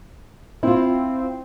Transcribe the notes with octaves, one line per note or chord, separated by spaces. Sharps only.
C4 E4 F4